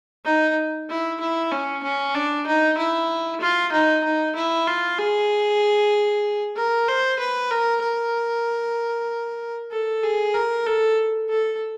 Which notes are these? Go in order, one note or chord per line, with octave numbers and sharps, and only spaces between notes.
D#4
E4
E4
C#4
C#4
D4
D#4
E4
F4
D#4
D#4
E4
F4
G#4
A#4
C5
B4
A#4
A#4
A4
G#4
A#4
A4
A4